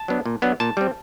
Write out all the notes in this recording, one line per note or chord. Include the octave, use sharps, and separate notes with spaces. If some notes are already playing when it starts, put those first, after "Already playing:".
Already playing: A5
F#3 B3 D4
A#2
F#3 B3 D4
A#2 A5
G3 C4